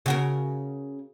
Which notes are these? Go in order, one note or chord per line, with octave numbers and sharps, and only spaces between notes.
C#3 F#4 A#4